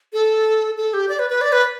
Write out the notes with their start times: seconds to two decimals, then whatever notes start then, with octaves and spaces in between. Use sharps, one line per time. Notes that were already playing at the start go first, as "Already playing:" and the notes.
0.13 A4
0.77 A4
0.94 G4
1.09 D5
1.19 B4
1.30 B4
1.41 D5
1.52 B4